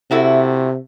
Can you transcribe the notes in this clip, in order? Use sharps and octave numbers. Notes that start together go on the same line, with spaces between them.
C3 A3 E4 F#4